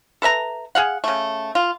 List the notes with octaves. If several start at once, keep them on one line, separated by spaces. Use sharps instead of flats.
A4 B4 E5 A#5
G#4 F5 F#5
C#3 A3
F4